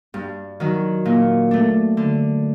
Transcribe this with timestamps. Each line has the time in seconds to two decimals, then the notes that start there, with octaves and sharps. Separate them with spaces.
0.14 G2
0.60 D#3 F#3
1.05 A#2
1.51 A3 D4
1.97 D3